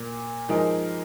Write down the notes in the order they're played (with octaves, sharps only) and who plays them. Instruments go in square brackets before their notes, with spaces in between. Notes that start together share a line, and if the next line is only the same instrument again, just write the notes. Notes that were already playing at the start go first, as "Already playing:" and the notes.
Already playing: [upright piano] A#2 A#3
F3 G#3 D#4 A#4